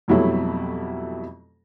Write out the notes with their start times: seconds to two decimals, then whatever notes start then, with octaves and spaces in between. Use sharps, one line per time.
0.08 F2 B2 F#3 G3 A3 E4